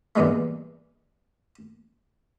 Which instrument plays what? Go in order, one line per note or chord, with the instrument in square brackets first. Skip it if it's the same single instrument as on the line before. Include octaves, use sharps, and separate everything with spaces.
[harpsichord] E2 G2 A#2 E3 G#3 A3